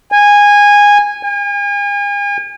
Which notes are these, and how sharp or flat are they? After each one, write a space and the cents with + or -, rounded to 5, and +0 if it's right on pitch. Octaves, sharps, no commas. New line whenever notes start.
G#5 -15
G#5 -40